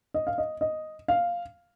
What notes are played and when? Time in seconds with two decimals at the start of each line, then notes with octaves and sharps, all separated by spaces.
0.14 D#5
0.27 F5
0.38 D#5
0.61 D#5
1.08 F5